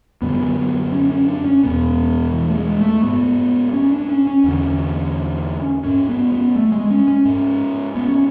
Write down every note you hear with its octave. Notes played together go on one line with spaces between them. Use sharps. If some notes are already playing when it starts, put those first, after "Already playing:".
F#2 D3 B3
C#4
C#4
D4
C#4
E2 B2 B3
E3
A3
G#3
A3
G#2 B3
C#4
D4
C#4
C#4
E2 D3
G#2 C#4
B3
B3
A3
G#3
C#4
C#4
G#2
B3
C#4